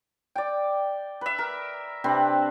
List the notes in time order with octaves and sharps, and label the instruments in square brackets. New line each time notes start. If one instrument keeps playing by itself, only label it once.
[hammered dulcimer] D5 G5
B4 E5
A#4
C3 C4 D4 B4